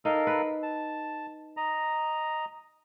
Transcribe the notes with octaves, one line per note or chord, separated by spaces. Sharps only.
D#4 A4 A#4 F5
B4
A5
D#5 A#5